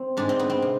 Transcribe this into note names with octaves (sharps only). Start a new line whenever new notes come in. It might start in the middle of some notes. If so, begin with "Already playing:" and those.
Already playing: C4
G#2 G#3 D4
C4
B3
C4
C3